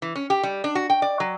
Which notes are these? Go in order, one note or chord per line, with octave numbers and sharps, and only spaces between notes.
E3
C#4
G4
G3
D4
F#4
G5
D5
F#3